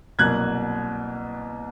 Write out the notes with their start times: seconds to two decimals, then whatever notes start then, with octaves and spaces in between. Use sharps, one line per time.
0.19 C2 B2 F#3 A#3 F#6 G#6